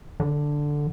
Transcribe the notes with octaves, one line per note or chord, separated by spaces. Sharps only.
D3